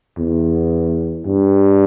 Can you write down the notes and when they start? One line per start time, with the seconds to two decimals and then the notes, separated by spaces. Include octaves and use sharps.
0.18 E2
1.26 G2